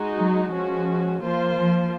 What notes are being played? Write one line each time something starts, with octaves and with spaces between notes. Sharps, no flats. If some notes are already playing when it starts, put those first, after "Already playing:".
Already playing: G#3 D#4 F#4
F#3
F3 G#3 C#4 F#4
F3 A#3 F4 C5
F3